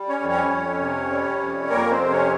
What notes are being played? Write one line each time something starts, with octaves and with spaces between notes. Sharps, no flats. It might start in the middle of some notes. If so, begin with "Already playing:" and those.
Already playing: G3
C#4 C#5
F2
C#4 C#5
F2
C3
G3
F2
F2 A#3 A#4
C4 C5
C3
C#4 C#5